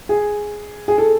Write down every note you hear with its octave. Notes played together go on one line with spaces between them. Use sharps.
G#4
G#4
A4